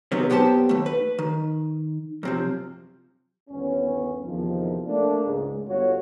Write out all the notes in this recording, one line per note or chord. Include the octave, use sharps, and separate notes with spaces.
C3 D#3 F#3 G#3 B3
F#2 B3 G4 C5 A5
D#2 A3
B4
D#3
F#2 C3 F3
G1 D#2 B3 C#4
E2 C3 D#3 F3
A3 A#3 D4
C#2 G#2
G1 F4 F#4 C#5